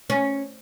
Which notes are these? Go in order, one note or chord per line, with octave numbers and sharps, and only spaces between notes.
C#4